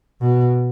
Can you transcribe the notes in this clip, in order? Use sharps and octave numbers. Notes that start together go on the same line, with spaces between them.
B2